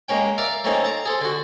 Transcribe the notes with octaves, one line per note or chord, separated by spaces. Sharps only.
G#3 A#3 C#4 G5
A#4 D5 E5 F5
A3 A#3 C4 C#4 D#4
A5 A#5
G#4 A4 C5
D3 F#4